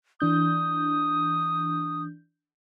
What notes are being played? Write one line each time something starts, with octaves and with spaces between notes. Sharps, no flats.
E3 D4 D#6 G6